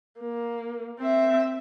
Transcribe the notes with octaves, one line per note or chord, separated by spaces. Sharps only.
A#3
C4 E5